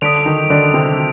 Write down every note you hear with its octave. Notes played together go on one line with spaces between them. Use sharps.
D3 D4 D#6 B6 D7 F7
D#3 D#4
D3 D4
C3 C4